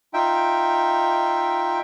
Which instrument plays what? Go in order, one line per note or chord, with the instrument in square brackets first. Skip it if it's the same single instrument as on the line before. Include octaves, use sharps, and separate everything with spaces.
[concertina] D#4 F4 E5 G5